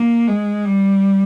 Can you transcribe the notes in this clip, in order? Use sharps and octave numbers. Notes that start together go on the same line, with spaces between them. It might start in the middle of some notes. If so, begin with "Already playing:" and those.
Already playing: A#3
G#3
G3